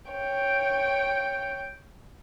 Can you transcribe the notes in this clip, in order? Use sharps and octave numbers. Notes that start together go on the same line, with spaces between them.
C#5 G5